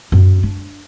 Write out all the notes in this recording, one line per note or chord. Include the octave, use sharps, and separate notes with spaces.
F#2
D4